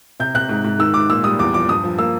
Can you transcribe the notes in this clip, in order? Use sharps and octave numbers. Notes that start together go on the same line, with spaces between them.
C3 G6
C3 F#6
G#2
G#2
D#3 E6
G#2 D6
A#2 E6
G3 D#6
E2 D6
F3 D6
G2 D#6
F3
A#3 E6